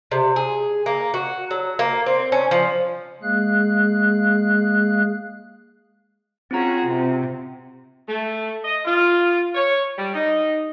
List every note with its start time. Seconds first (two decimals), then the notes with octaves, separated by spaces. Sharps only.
0.11 C3
0.36 G#4
0.86 A#3
1.14 F#4
1.51 F#3
1.79 A#3
2.06 C4
2.32 C#4
2.51 F3
3.22 G#3 A#3 G#4 F5 F#6
6.51 C4 C#4 F4 F#4 G#4 A#5
6.85 C3
8.07 A3
8.64 D#5
8.85 F4
9.55 C#5
9.97 G3
10.14 D#4